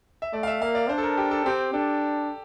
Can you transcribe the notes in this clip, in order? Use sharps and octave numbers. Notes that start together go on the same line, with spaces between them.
E5
A3 D5
F5
E5
A#3 F5
D5
D4 C5
A4
A#4
G4
A4
C4 G4
D4 A4